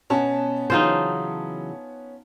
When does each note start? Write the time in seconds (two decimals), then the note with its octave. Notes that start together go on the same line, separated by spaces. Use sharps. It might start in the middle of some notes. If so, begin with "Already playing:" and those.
0.10 B2 B3 C#4 A5
0.70 C#3 E3 F#3 D#4 F4 C5